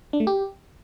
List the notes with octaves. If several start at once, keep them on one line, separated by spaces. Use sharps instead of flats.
D4
A3
G4